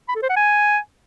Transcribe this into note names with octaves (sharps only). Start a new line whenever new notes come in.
B5
A4
C5
F#5
G#5